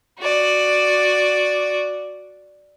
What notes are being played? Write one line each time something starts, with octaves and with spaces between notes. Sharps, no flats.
F#4 D5